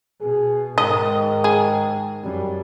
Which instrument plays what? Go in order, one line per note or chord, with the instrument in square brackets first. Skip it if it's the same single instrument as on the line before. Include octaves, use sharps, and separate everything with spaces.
[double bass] B2 [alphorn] G#4
[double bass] G#2 [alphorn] D#3 [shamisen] D#5
[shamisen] G#4
[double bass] F#2 [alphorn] G3